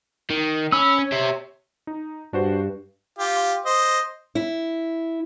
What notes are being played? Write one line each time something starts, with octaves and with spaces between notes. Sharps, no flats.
D#3
C#4 B5 E6
C#5
G4 E5
D#4
G2 D4 F#4 C5
F4 G4
C5 D#5
E4